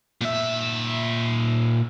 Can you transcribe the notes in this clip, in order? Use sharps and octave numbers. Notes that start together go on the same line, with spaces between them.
A#2 E5